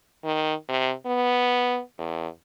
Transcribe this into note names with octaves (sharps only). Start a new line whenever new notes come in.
D#3
C3
B3
E2